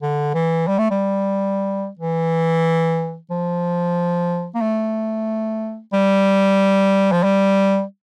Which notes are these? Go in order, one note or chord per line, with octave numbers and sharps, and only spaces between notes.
D3
E3
G3
A3
G3
E3
F3
A#3
A3
G3
F3
G3